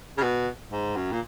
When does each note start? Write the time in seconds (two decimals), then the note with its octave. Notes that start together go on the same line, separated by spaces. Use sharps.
0.17 C#3
0.22 B2
0.72 G#2
0.96 F#2
1.12 A#2